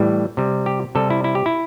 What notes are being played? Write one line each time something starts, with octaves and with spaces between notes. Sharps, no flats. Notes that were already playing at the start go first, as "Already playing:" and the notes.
Already playing: A2 E3 G3
C3 G3
G4
C3 G3 A4
E4
E4
G4
E4